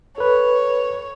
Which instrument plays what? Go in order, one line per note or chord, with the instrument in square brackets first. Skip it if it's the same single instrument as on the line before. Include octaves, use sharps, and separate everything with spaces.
[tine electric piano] A4 B4 [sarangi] C#5